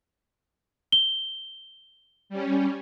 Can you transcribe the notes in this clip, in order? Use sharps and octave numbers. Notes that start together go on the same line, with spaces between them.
G7
G3 C#4